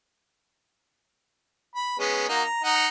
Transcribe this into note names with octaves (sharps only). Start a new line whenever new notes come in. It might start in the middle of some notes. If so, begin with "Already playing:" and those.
B5
G#3 B3 C#4
A#3 D#4 F#4
A#5
D#4 F#5